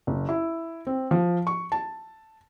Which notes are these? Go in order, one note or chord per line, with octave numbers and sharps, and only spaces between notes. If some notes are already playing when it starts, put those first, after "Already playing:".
F#1
E4
C4
F3
C#6
A5